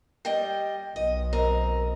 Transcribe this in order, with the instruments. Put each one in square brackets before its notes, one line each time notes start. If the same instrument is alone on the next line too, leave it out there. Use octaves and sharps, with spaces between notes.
[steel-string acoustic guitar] G3 D#5 G5
[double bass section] B1 [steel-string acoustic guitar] D#5
[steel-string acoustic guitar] C4 A#4 D#5